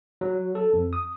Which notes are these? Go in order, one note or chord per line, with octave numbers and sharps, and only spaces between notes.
F#3
A4
F2
D#6